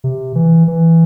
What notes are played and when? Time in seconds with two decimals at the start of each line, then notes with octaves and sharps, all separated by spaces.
0.04 C3
0.35 E3
0.68 E3